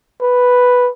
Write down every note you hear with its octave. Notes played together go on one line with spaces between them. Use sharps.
B4